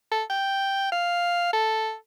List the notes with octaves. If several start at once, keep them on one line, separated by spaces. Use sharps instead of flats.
A4
G5
F5
A4